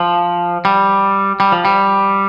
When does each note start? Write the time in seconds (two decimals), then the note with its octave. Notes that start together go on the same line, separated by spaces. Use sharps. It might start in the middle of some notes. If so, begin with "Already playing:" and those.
Already playing: F3
0.65 G3
1.40 G3
1.52 F3
1.65 G3